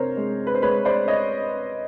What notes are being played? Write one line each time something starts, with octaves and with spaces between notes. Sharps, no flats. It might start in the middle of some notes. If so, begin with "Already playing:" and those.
Already playing: C3 A#4 C5 C#5
G#3
B4
C5
G#3 B4 C#5
C5 D5
C#5 D#5